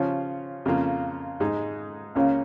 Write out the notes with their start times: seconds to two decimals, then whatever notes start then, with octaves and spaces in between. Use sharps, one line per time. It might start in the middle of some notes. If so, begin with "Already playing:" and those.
Already playing: C#3 F3 C#4 F4
0.66 F2 C#3 A#3 F4
1.40 G#2 G#3 D#4
2.15 C#2 C#3 A#3 C#4 F4